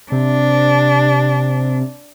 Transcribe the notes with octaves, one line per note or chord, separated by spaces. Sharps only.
C3 D4